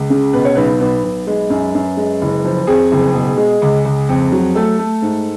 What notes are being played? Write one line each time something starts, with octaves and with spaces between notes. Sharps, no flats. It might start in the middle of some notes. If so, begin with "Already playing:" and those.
Already playing: C#2
C#3
B2 B4
C#5
B1 B4
B1 B4
B1
G#3
F#2
F#2
G#3
F#1
F3
F2 G#4
F#1
B2
G#3
C#2
C#2
F2
F#3
A3 A4
A3
G#2